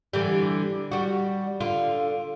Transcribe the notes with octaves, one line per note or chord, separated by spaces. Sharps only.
D3 E3 G3
G3 F#4
D3 F4